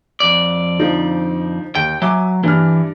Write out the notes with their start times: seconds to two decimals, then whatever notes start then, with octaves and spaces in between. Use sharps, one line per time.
0.20 F2 D5
0.79 D3 F3 D#4
1.75 D#2 G5
2.02 F#3 E5 G#5 D6
2.43 G2 E3 D4 F6